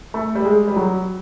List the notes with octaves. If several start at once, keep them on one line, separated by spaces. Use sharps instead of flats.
A3
G3
G#3
G3
F#3